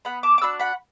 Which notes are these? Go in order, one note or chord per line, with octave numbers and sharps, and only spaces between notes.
B3 F#5 B5
A5 D6
D6
D4 F#4 B5 E6
F#5 B5